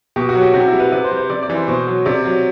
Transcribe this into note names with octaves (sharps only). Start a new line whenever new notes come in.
B2 G4
F#4
F#3
G4
C3 F#4
E4
G3
B4
C3 B4
C5
G3
C5
C3 D5
D5
E3 G3
C5
B2 C5
F#3
C3 D5
F#3